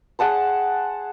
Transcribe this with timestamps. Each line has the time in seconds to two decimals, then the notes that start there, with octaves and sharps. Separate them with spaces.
0.19 G#4 F#5 A5 C6